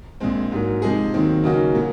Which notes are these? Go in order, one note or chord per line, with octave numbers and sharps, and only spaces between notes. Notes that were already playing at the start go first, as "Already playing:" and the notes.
A#1 A#2 G#3 C4
G#2 F#3 A#3
C3 F3 G#3 D#4 G#4
D#2 D#3 F#3 C4
C#3 F#3 A#3 D#4 F#4
A#2 F#3 A#3